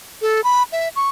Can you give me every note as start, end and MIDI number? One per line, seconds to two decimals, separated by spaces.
0.22 0.43 69
0.44 0.63 83
0.72 0.89 76
0.96 1.09 85